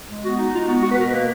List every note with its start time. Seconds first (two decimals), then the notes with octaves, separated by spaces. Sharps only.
0.09 G#3
0.23 B3 F#4
0.39 D#4
0.53 G#3 F4
0.68 B3 F#4
0.83 B3 F#4
0.91 B4
0.98 B2 A#4
1.13 A#3 B4